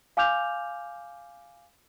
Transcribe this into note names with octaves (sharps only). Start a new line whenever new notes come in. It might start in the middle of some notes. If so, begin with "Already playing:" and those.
F5 G#5 D6 F6 G6 F7